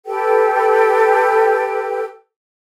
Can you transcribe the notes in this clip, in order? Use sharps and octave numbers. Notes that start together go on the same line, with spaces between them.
G4 A4 B4 G5